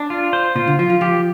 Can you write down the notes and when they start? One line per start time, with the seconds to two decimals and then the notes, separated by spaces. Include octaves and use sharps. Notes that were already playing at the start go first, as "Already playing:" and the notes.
Already playing: D4
0.10 F4
0.33 C5
0.56 A#2 F4
0.67 D3
0.79 F3 F4
0.90 F3
1.01 F3 G4